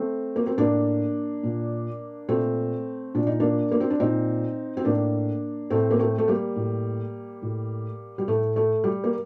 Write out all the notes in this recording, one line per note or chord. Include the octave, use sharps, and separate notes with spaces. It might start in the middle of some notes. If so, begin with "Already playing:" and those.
Already playing: A3 C4
A#3
C4
A2 A#3 D4
A#2
A#2 A3 C4
A#2 D4
D#4
A#3 D4
A#3
C4
D4
A#2 C4 D#4
C4
A2 A#3 D4
A2 A3 C4
A#3
A3 C4
A3
G3 A#3
A2
A2
G3
A2 A3
A3
G3
A#3